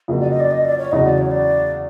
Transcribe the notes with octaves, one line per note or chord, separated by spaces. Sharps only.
F2 C#3 F#3 A#3 G#4
D5
D#5
D5
D#5
D5
C#5
E2 C#3 F#3 D#5
D5
C#5
D5